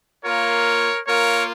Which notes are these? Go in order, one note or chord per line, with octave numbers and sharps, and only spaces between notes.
A#3 F4 A#4 C#5
A#3 F4 A#4 C#5